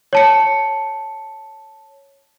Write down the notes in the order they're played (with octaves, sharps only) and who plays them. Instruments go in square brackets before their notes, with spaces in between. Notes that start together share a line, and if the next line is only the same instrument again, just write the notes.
[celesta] C#5 A5 C#7